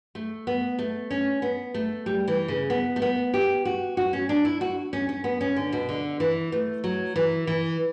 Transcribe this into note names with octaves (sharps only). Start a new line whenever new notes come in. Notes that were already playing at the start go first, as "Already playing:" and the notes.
A3
B3
A3
C#4
B3
A3
G3
E3
C#3
B3
A3
B3
G4
F#4
F#4
C#4
D4
E4
F#4
C#4
C#4
B3
C#4
D3
B2
D3
E3
A3
F#3
E3
E3